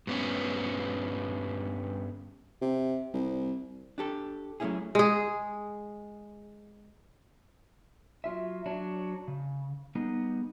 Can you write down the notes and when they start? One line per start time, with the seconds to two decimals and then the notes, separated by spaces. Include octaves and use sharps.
0.07 G2 B3 C#4
2.62 C3
3.14 C2
3.98 D4 G4 A4
4.60 F#3 A3 A#3 C#4 E4 G#4
4.95 G#3 G#4
8.24 F#3 F4 E5
8.66 F#3 D4 C#5
9.28 C#3
9.95 G3 B3 D#4 G#4